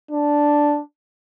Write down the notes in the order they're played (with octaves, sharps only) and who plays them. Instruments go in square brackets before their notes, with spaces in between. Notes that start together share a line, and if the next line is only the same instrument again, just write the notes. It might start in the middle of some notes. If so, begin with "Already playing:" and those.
[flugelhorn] D4